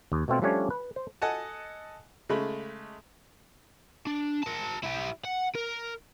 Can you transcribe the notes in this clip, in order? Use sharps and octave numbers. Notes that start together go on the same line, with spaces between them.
D#2
B2 A3 C4 F4
F3 G3 A3 C#4 D4 C#5
B4
C5
A4 D#5 F#5 G#5 A5
C#3 G#3 A3 B5
D4
A#4 A5
E4 G4
F#5
A#4